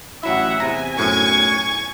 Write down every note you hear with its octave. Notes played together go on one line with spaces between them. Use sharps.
A1 F#3 E4 E5 F#5
E2 C3 G#5 A#5
B1 F#2 A2 C#6 G#6